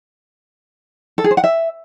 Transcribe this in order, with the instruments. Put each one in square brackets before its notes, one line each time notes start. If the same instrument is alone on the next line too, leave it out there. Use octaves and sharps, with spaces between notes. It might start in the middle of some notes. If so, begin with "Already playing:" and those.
[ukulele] A4
G#4
C5
F#5
E5